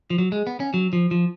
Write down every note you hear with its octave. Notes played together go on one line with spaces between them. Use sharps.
F3
F#3
G#3
B3
C#4
F#3
F3
F3